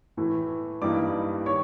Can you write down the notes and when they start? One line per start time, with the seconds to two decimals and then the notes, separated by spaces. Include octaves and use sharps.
0.17 A2 E3 A3
0.82 G2 E3 G3 A#3 D#4 D5 D6
1.46 D#3 C#5 C#6